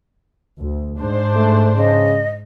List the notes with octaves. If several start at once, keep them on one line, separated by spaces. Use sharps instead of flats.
D2
G#2 D4 C5
A3
C#3 D#5